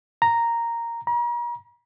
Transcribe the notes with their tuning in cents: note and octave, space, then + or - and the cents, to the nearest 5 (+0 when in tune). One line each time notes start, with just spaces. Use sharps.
A#5 -5
A#5 +40